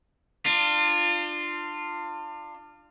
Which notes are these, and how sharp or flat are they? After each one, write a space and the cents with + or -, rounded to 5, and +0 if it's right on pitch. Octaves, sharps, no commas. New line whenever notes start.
D4 +30 F4 -5